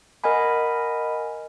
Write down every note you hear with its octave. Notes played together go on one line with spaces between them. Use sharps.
A#4 D#5 F#5 G#5 B5